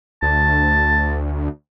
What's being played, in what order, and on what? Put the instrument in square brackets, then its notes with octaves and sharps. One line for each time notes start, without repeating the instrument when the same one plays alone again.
[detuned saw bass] D2 [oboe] A5